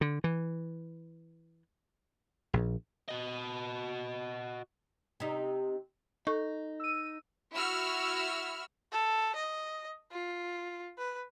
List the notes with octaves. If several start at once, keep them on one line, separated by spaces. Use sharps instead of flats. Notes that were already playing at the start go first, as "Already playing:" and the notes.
D3
E3
A#1
F#4 D#5
C3 D#4
D#4 A4 C#6
E6 D#7
E4 F#4 E6 F6
A4
D#5
F4
B4